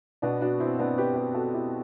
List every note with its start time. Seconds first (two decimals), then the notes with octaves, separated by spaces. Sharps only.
0.22 B2 B3 D4
0.41 D4 F#4
0.60 C4 E4
0.79 B3 D4
0.98 G4 B4
1.16 G4 B4
1.35 F#4 A4
1.54 E4 G4